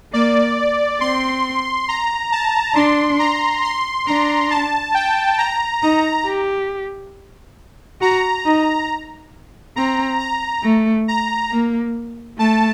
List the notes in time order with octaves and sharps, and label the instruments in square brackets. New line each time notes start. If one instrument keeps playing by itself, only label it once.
[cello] A#3 [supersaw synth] D5
[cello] C4 [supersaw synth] C6
[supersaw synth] A#5
A5
[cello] D4 [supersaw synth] C6
[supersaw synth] A#5
C6
[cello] D4 [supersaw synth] A#5
[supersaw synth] A5
G5
A#5
[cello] D#4 [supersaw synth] A#5
[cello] G4
[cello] F#4 [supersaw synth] A#5
[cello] D#4
[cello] C4 [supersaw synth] A#5
[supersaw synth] A#5
[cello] A3
[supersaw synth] A#5
[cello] A#3
[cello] A3 [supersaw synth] A5